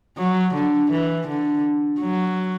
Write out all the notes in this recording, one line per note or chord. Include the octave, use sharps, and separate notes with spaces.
F#3
D3
E3
D3
F#3